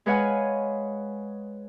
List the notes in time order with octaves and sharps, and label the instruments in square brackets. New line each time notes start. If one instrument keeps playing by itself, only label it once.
[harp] G#3 B4 C#5 F5 F#5 G#5